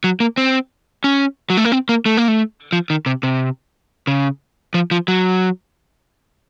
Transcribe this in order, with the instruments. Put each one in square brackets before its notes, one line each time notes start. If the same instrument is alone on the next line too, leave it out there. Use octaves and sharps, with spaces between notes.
[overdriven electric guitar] F#3
A#3
C4
C#4
F#3
A3
A#3
C4
A#3
A3
A#3
A3
F3
D#3
C3
C3
C#3
F3
F3
F#3